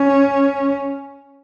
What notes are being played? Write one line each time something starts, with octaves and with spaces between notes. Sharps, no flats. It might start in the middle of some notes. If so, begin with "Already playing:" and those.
Already playing: C#4